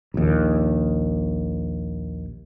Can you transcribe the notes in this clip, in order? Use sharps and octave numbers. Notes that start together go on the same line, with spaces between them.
A#1 D#2